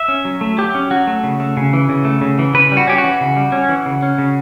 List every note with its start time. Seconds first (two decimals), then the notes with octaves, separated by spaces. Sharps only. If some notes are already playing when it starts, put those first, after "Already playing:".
Already playing: E5
0.08 C#4
0.25 F#3
0.41 A3
0.58 F#3 G4
0.74 C#4
0.90 F#3 F#4
1.07 A3
1.24 C#3
1.40 A3
1.57 C#3
1.73 E3
1.89 C#3
2.05 A3
2.21 C#3
2.39 E3
2.54 C#3 B4
2.72 G3
2.77 F#4
2.87 C#4 G4
2.98 F#4
3.04 E3
3.21 C#3
3.37 G3
3.52 C#4
3.69 E3
3.86 C#3
4.03 C#4
4.18 C#3